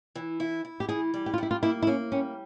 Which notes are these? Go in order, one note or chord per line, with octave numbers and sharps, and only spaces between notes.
E3
E4
E4
G4
E3 G#4
G3
G4
F4
G3 E4
F4
A#3 E4
E4
A#3 C#4
G3 C#4